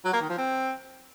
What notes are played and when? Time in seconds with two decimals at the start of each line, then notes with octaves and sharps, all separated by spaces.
0.05 F#3
0.13 A#3
0.21 D#3
0.29 F3
0.38 C4